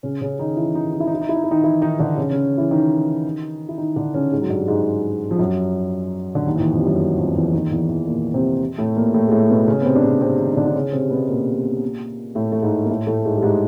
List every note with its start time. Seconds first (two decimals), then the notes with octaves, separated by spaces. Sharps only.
0.03 C#3 C#4
0.21 C#3 C#4
0.39 D#3 D#4
0.57 E3 E4
0.75 D#3 D#4
0.93 D#4
1.00 E4
1.07 D#4
1.14 E4
1.21 D#4
1.29 E4
1.36 D#4
1.44 E4
1.51 D#3 D#4
1.64 E3 E4
1.82 D#3 D#4
1.99 D3 D4
2.17 C#3 C#4
2.31 C#3 C#4
2.58 E3 E4
2.71 D#3 D#4
3.69 E4
3.78 D#3 D#4
3.96 D3 D4
4.14 C#3 C#4
4.32 G#2 G#3
4.41 F#3
4.50 G2 G3
4.68 G#2 G#3
5.31 F3
5.39 F#2 F#3
6.35 D3
6.46 D#2 D#3
6.56 E3
6.59 D#2 D#3
6.73 F2 F3
6.80 G3
6.86 F#2 F#3
7.18 F2 F3
7.36 E2 E3
7.53 D#2 D#3
7.71 E2 E3
7.89 E2 E3
8.07 A#2 A#3
8.34 C3 C4
8.78 A2 A3
8.96 A#2 A#3
9.14 A2 A3
9.28 G#3
9.31 A2 A3
9.50 B2 B3
9.68 C#3 C#4
9.82 B3
9.85 C3 C4
9.95 D4
10.03 C#3 C#4
10.21 C3 C4
10.39 D#3 D#4
10.52 D#4
10.57 D3 D4
10.67 D4
10.75 C#3 C#4
10.93 C3 C4
11.11 B2 B3
11.29 A#2 A#3
12.35 A2 A3
12.52 A3
12.62 G#2 G#3
12.85 A#3
12.89 A2 A3
13.07 A2 A3
13.25 G#2 G#3
13.36 G3
13.42 G#2 G#3